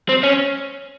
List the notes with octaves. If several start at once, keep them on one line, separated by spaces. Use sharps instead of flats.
C4
C#4